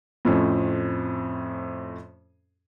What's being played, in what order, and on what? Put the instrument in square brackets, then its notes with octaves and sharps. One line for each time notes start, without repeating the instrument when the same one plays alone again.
[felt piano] F2 A2 C4 C#4